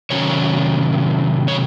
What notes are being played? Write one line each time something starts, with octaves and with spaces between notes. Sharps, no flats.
C3 D#3 F#3 C#4 C#5
C#5